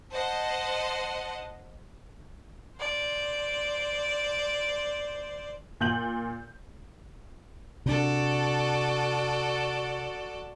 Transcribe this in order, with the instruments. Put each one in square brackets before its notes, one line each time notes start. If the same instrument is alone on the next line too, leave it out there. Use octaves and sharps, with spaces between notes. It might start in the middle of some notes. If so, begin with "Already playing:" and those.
[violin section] C5 D#5 F#5 A5
[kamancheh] C5 D5
[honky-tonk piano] A#2 G6 F#7
[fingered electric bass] C3 D4 [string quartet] F#4 A4 D5